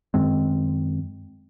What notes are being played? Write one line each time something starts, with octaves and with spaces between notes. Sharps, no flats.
F#2 D#3 G#3 C4